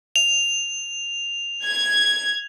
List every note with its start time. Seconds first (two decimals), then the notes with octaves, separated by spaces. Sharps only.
0.16 F7
1.65 G#6